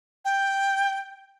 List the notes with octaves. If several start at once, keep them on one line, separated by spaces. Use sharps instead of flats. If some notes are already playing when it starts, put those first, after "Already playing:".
G5